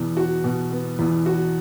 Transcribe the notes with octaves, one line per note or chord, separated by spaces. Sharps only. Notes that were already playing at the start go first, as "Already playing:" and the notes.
Already playing: E2 B2 B3
F#4
B2
B3
E2
F#4